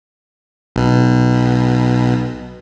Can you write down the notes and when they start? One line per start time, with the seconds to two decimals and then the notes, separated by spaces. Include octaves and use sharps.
0.76 B1 B2